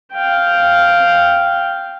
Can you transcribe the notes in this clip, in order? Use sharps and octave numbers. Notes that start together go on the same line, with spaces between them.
F5 G5